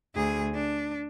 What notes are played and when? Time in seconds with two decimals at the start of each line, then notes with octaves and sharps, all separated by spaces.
0.15 D2 G#4
0.54 D4